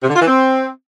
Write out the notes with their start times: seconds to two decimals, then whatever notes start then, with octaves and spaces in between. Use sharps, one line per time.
0.03 C3
0.09 D3
0.16 F4
0.22 E3
0.28 C4